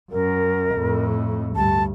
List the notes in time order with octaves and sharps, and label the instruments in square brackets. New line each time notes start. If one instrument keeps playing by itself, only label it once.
[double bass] F#2 [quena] A#4
[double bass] F2 A2
[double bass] D2 G2 [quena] A5